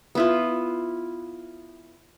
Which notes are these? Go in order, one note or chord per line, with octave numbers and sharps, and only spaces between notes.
B3 E4 F4